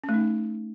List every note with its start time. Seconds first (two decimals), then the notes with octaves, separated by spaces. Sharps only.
0.04 C#4
0.09 A3
0.14 D#4